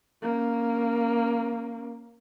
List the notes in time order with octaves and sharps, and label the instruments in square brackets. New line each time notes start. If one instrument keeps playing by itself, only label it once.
[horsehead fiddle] A#3 C#4